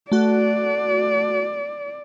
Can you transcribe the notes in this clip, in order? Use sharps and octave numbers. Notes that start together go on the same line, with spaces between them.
A3 F#4 D5